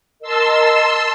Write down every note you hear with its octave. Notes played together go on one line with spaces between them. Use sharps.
A#4 D#5 A5 C6 E6